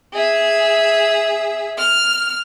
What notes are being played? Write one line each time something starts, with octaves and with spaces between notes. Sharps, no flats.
G#4 E5
F6